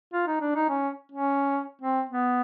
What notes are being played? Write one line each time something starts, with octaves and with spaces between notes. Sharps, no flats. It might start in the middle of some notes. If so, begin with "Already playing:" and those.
F4
D#4
D4
D#4
C#4
C#4
C4
B3